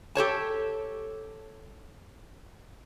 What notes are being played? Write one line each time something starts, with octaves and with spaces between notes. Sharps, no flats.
G4 A4 C#5 A5